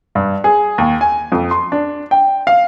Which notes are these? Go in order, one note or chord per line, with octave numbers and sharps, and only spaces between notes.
G2
G#4
D#2
G#5
F2
C6
D4
G5
F5